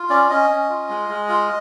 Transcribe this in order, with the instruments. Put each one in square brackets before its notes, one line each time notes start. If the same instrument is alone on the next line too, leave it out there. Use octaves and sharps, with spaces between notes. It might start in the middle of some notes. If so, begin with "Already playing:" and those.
Already playing: [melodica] F4
C#4 D5
C#4 D#5
C#4
F4
G#3
G#3
F4